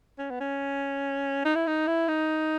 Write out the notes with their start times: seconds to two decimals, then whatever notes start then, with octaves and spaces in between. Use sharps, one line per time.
0.19 C#4
0.31 B3
0.40 C#4
1.45 D#4
1.55 E4
1.67 D#4
1.87 E4
2.08 D#4